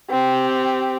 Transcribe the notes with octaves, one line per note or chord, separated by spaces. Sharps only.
C4 G4